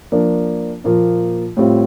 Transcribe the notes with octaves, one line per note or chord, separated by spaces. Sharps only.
F3 A#3 D4
A#2 F3 A#3 F4
A2 G3 C4 F4